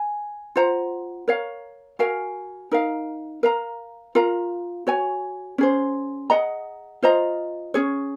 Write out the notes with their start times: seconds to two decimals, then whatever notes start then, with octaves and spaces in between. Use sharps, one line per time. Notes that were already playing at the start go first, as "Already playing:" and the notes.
Already playing: G#5
0.56 F4 C5 F#5 A#5
1.28 A#4 C#5 F5
1.99 F#4 A#4 F5 G#5
2.71 D#4 A#4 F5
3.43 A#4 F5 A#5
4.15 F4 A#4 F5 A#5
4.87 F#4 C#5 G#5
5.58 C#4 G#4 C5
6.30 G#4 D#5 F#5 A#5
7.02 F4 C5 D#5 A#5
7.74 C#4 G#4 C#5